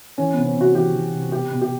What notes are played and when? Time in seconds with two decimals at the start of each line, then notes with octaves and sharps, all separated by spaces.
0.18 E3 C#4
0.33 C3 B3
0.47 C#4
0.56 C3 F#4
0.75 E3 G4
0.94 E3
1.14 C3
1.32 B2 G4
1.52 B2
1.62 G4